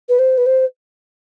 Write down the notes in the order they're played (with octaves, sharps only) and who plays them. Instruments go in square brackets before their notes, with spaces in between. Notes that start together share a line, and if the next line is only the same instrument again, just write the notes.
[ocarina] B4
C5
B4
C5